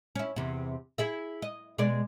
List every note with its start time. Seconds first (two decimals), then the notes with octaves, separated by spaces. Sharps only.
0.15 C#4 E4
0.36 E2 C3
0.98 E4 G#4 E5
1.42 D#5
1.78 B2 G#3 D5